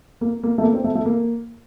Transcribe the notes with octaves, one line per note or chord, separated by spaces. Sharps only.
A#3
A#3
A3
A#3
C4
A3
A3
A#3